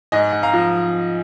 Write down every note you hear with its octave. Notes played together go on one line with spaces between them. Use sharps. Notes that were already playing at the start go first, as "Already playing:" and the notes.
G#2 D#5 G#5
G#2
F5 A#5
F3